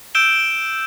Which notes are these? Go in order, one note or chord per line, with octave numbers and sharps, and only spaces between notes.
E6 G6 D7 E7 G7